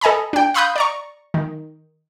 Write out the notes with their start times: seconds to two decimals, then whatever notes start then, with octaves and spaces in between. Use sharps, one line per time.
0.01 A4 D#5 G#5 A#5 B5
0.33 D4 G5
0.54 F5 B5 C6 D#6 F#6 G6
0.76 D5 A#5 C#6
1.34 D#3